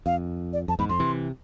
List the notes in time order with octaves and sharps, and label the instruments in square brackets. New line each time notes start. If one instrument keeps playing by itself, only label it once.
[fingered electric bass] F2 [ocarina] F5
[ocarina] D5
[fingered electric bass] F2 [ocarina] A5
[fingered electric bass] E2 G#2 [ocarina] B5
[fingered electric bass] F2 [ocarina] C6
[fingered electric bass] C3 E3